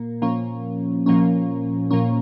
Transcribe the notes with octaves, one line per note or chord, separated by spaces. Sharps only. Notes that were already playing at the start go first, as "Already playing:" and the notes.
Already playing: A#2 A#3
A#2 F3 A#3 C#4
A#2 F3 A#3 C#4
A#2 F3 A#3 C#4